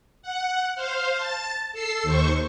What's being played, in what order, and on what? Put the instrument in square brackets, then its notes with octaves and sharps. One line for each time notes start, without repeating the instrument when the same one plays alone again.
[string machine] F#5
C5 F5
A5 A6
A4 E6 C7
D#2 C5 C#6